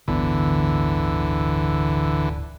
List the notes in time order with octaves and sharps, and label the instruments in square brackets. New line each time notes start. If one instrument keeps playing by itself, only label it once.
[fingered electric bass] D1 G1 B3 [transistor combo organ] D3 E3